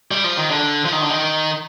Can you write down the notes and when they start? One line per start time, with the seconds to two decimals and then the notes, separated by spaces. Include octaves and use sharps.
0.11 G3
0.24 F3
0.37 D#3
0.50 D3
0.85 F3
0.92 D#3
1.02 D3
1.10 D#3